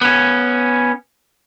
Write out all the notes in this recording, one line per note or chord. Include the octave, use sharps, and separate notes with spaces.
B3 C#4